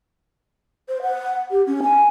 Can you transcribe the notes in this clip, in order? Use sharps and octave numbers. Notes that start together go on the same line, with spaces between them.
C5
F#5
G4
C#4
G#5